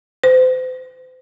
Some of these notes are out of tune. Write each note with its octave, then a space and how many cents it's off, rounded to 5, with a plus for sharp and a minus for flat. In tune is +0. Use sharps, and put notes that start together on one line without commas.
C5 -35